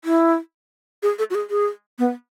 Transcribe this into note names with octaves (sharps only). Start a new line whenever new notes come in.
E4
G#4
A4
F#4
G#4
G#4
B3